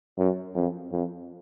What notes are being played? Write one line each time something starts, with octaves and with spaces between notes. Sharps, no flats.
F#2
F2
F2